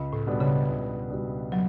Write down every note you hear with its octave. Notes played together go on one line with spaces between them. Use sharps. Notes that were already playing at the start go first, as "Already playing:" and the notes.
Already playing: C#2
A2
B2 G3 B3 D4
C#3
C#2
B2 G3 B3 D4
F#3